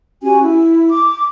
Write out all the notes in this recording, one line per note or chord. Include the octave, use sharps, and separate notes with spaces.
C#4 F#4 G4 G#5
E4
D6